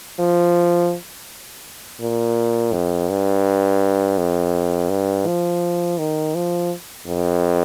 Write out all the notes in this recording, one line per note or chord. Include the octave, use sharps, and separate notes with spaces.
F3
A#2
F2
G2
F2
G2
F3
D#3
F3
F2